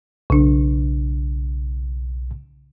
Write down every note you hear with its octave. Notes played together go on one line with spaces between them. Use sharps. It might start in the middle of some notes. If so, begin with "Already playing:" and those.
B1 C#3 D4